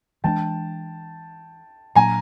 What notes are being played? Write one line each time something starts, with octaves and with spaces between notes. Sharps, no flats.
E3 G#3 B3 D4 G5 A5
A#2 F#3 A#3 D4 G#5 A#5